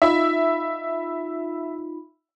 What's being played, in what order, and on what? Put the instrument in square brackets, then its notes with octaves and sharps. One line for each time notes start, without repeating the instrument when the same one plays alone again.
[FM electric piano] D#4 F4 B5 [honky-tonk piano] E5